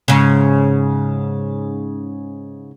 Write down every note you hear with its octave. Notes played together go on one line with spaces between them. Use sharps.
G#2 C#3